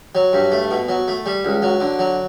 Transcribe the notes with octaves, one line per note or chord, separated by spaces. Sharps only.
F#3
G2
A3
B2
F#3
A3
G3
C#2
F#3
D3
F#3